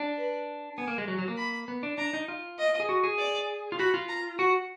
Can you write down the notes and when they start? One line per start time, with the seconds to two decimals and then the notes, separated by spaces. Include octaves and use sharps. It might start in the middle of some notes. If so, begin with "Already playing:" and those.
Already playing: D4
0.17 B4
0.77 B3 G#5
0.88 A#3
0.98 G#3
1.08 F#3
1.19 F#3
1.28 A#3
1.38 B5
1.68 B3
1.83 D4
1.98 D4 A#5
2.13 D#4
2.28 F4
2.59 D#5
2.80 G#4
2.89 F#4
3.04 G#4
3.18 D5
3.72 F4
3.79 F#4 B5
3.94 F4
4.09 A#5
4.39 F#4 F#5